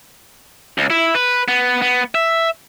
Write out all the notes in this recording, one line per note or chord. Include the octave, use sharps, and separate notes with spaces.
C#2
E4
B4
B3
B3
E5